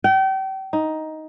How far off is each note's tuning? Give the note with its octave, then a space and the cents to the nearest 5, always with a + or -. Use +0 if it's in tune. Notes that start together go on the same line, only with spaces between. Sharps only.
G5 -35
D#4 +10